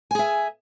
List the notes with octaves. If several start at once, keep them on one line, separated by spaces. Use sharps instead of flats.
G#4 E5 G#5